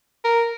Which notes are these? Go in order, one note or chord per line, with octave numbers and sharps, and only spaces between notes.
A#4